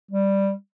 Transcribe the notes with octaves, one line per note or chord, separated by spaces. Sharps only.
G3